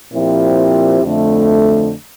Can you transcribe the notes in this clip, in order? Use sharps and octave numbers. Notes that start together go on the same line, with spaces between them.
A#2 F3 C4 E4 G4
F2 D3 A3